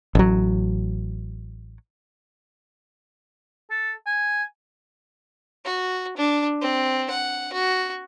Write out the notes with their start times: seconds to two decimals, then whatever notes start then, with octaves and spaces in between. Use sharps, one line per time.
0.15 A1 F#3
3.70 A4
4.06 G#5
5.65 F#4
6.17 D4
6.61 C4
7.10 F#5
7.53 F#4